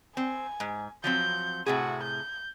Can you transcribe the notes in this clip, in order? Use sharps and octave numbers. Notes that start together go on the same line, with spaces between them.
C4 G#5
G#2
F3 F#3 C4 G6
A2 C3 F#4 G#4
G6